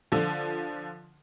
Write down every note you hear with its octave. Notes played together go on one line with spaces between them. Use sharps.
D3 F3